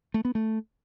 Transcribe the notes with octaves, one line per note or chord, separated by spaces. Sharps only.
A3
B3
A3